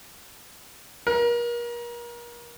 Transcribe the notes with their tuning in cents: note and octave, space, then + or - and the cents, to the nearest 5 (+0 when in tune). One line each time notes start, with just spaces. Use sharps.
A#4 +35